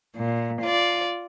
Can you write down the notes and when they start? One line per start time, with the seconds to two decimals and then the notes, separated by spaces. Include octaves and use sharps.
0.16 A#2
0.62 F4 D5